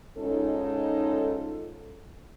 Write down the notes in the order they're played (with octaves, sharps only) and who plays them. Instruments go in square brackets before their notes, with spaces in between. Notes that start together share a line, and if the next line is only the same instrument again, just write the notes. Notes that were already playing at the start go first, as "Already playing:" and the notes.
[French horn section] G#2 C#4 D#4 F4 A4